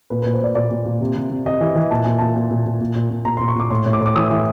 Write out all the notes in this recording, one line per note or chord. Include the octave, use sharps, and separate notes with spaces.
A#2 B4
B4
A#2
C5
A#2 D5
A#2 D5
A#2
A#2
C3
C3
C3
C3 D#5
E3
E3
A#2 A5
A#2 G#5
A#2 A5
A#2
A#2
A#2
A#2
A#2
A#2
A#2 A#5
C6
A#2
C#6
A#2 D6
A2 C6
A2
D6
A2
D6
E3 D#6
E3